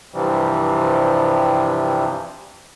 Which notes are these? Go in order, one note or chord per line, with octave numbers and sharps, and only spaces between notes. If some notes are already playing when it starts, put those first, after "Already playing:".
G2 C3 E3 F3 G3